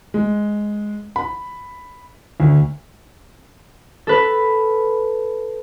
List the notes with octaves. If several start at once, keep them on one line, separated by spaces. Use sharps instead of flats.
G#3
B5
D2
A4 B4